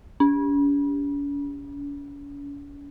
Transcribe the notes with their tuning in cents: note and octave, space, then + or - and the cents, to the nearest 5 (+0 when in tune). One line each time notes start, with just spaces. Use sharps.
C#4 +45